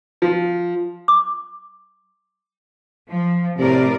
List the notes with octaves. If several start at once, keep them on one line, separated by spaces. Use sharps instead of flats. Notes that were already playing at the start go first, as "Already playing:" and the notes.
F3
D6
F3
A2 C3 A#4 D5